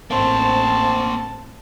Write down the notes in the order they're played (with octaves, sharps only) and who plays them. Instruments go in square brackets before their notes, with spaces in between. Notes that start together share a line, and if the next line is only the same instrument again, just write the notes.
[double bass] A1 C4 [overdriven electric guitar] A#3 C5 [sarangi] A5